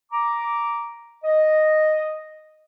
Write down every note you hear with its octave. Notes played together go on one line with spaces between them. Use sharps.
A#5 D6
D#5